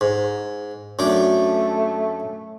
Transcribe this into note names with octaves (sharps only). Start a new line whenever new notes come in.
G#2
F#2 A3 D4 D6